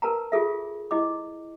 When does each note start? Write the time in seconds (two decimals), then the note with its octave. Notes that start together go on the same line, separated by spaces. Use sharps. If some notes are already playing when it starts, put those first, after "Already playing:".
0.02 A#4 B4 A5 A#5
0.32 F4 G#4 A4 E5
0.91 E4 D#5 D6